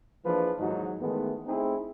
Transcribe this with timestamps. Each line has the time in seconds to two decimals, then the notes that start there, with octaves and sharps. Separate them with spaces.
0.25 E3 F3 A#3 D4 G#4 B4
0.59 D#2 G#2 E3 F#3 D#4 F#4
1.01 D#3 E3 G#3 A3 B3
1.46 A3 C4 D#4 E4 G#4